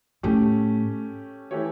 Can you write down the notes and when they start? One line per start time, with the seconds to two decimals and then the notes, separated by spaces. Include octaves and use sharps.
0.23 A2 A3 C#4 G4
1.51 E3 A3 E4 G4 C#5